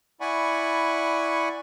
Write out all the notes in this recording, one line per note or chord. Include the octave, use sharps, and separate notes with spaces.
E4 D5 F#5 G#5 B5 C#6